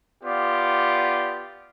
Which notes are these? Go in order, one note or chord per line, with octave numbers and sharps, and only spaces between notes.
B3 F4 G4 D5